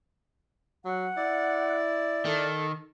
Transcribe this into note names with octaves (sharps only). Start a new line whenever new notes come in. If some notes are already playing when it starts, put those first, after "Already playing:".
F#3 F#5
E4 D5
D#3 A4